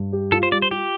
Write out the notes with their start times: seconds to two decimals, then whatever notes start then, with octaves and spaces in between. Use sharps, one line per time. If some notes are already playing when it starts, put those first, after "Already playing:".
Already playing: G2
0.13 G4
0.32 F4 A4
0.43 C5
0.52 G3 D5
0.62 C5
0.71 F4 G4